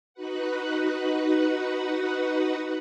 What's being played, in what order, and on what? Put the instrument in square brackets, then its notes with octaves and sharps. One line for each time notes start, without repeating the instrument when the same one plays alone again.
[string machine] D#4 F#4 B4 F#5